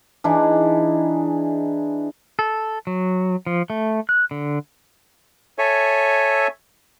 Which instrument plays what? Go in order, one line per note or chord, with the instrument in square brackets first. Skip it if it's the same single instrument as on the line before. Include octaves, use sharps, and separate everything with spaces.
[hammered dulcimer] E3 D4 D#4 G#4
[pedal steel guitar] A4
F#3
F3
A3
F#6
D3
[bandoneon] A4 C#5 E5 G#5